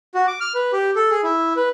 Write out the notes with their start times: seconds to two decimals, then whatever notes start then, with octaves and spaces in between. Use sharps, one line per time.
0.15 F#4
0.27 D6
0.40 F6
0.54 B4
0.73 G4
0.96 A4
1.10 G#4
1.23 E4
1.56 B4